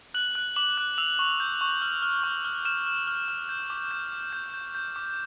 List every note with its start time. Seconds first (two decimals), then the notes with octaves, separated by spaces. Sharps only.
0.14 F#6 F#7
0.35 F#6
0.56 D6 F#7
0.77 F#6
0.98 E6 F7
1.19 C#6
1.40 G6
1.61 C#6
1.82 F6
2.02 F6
2.23 C#6
2.44 F6
2.65 F6 E7
2.86 F6
3.07 F6
3.28 F6
3.49 G6
3.70 D6
3.91 G6
4.12 D6
4.33 G6
4.54 G6
4.75 G6
4.96 D6